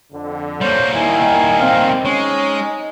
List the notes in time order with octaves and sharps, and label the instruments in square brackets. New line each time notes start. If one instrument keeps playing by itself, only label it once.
[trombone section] F2 D3
[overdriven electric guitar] G3 A#3 [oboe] C5 [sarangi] C#5
[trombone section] D#3 [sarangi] E4 [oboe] G#5
[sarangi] C4 [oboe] F5
[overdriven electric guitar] G#3 [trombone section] C#4 [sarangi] D#4 [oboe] C#5